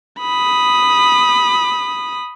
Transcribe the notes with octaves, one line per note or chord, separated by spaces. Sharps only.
B5 D#6